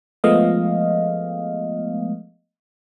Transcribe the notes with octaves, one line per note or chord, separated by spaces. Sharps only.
F3 G#3 A3 B3 D#5 F5